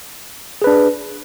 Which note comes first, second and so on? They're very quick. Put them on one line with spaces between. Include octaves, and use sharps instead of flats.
G#4 B4 D4